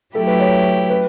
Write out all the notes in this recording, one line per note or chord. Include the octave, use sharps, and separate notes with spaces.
F#3 A3 E4 G4 A4
B4
C#5
B4